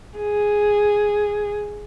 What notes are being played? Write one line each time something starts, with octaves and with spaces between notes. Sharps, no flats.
G#4